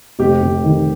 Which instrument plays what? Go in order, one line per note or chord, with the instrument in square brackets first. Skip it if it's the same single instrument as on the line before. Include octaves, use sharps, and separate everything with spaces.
[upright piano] F1 [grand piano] G4
[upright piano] F1
D#3